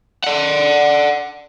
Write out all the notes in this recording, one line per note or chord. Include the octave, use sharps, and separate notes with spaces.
D5 F#5